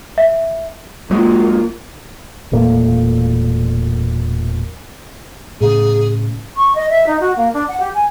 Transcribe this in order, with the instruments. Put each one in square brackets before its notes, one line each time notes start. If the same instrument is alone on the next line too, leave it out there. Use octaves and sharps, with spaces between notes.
[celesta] E5
[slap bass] D2 F#3 G#3 [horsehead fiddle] A#3 F4
[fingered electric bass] E1 A#2 A3 A#3
[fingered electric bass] A2 C#3 [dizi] G#4
[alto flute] C#6
D#5
E5
D#4
F#4
A#3
D4
F#5
G4
G#5